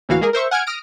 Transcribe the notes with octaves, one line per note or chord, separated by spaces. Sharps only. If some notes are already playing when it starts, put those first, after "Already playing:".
D2 A2 E3 A#3 F#4 F5
G#3 A#3 G#4 A#4
A#4 C5 E5 C#6
F#5 G#5 F6 G#6 D7
D#6 F6 A#6 D7